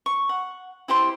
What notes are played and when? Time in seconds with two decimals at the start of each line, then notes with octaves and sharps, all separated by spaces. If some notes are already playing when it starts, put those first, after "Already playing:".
0.06 C#6
0.29 F#5
0.88 E4 G4 C5 C6